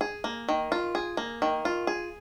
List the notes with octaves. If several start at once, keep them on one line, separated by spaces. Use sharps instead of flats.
G#4
A#3
D#3
F4
G#4
A#3
D#3
F4
G#4